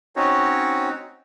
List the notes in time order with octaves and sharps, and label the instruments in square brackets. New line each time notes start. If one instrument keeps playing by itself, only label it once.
[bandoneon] C4 C#4 D#4 F#4 C#5